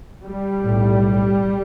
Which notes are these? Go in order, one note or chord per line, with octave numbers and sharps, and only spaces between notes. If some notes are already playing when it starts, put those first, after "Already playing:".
G3
B1 A2